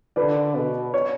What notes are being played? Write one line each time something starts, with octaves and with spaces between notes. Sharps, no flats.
D3 B4 D5
B2
C#5